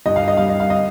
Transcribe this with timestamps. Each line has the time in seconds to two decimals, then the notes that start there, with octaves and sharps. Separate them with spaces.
0.06 G2 D#5
0.16 F5
0.28 D#5
0.37 G3 F5
0.49 D#5
0.60 F5
0.70 D#5